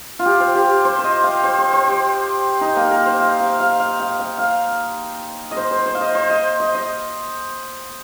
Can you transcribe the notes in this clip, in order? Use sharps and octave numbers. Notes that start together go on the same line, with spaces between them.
F4
G4
C5
G4
C5
C5
D#5
F5
C5
C5
C5
G4
D#4
A#3
A#4
C5
F5
F5
F5
F5
F5
F5
F5
D#5
C5
C5
C5
F5
D#5
C5
D#5
D#5
D#5